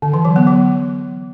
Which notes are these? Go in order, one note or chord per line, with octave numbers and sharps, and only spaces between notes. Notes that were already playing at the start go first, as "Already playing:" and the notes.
D3
E3
F#3
B3
F#3